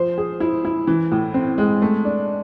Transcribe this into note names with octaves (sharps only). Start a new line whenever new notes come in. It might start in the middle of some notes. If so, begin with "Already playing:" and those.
Already playing: F3 C5
G#4
E4
E4
E3
A2
C4
G#3
A3
D4